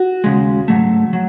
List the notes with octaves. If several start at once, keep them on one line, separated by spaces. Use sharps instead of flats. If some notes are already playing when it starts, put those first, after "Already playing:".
Already playing: F#4
D#2 C#3 G#3
G#2 F#3 A3
F#3